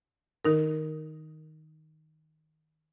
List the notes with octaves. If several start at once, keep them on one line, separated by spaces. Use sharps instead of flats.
D#3 D#4 A#4